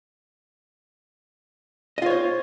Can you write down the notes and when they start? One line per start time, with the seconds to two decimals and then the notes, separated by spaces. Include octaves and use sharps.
1.98 D#5
2.02 F4
2.06 C#5
2.10 C5